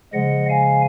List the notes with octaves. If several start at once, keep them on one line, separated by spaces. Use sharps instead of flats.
C#3 F3 G#3 D#5 F#5
F5 G#5